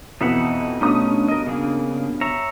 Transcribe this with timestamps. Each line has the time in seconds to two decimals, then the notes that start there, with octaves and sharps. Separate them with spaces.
0.21 F2 B2 E3 D#4 E5 F#5
0.81 G2 B2 A3 C#4 D#4 D#6
1.28 A#4 D#5
1.46 C#3 A#3 G#4
2.21 C#5 E5 A#5